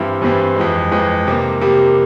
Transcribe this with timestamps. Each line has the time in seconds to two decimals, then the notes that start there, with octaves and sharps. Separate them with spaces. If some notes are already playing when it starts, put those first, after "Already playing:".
Already playing: G2 E3 G3 C4 E4
0.22 G2 E3 G3 C4 E4
0.56 F2 E3 G#3
0.91 F2 E3 G#3
1.27 C3 G3 A#3
1.61 C3 G3 A#3